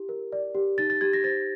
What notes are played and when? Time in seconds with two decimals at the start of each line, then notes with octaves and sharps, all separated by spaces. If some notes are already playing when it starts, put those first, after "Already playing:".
Already playing: E4 G4
0.09 A#4
0.32 D5
0.55 G4
0.78 D#4 A6
0.90 A6
1.01 G4 G#6
1.13 A#6
1.24 C5 A6